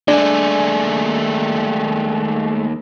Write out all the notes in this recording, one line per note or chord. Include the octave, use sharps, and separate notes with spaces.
D#2 G#3 A3 D4 D5 G#5